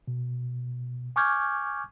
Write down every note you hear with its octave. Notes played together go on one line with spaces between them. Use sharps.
B2
G#5 C#6 D6 F6 G6 G#6